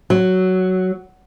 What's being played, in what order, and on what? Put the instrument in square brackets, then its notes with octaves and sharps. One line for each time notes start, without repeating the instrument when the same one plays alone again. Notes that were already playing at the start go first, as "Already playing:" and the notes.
[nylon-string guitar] F#3